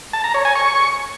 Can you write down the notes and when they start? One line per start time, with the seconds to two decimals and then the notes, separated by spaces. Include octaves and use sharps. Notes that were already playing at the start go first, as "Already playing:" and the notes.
0.13 A5
0.24 A#5
0.34 C#5
0.45 G#5
0.55 C#6